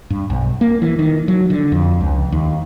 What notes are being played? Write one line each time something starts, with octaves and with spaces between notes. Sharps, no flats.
G2
B1
A#3
E3
D#3
F#3
D3
F2
C#2
D#2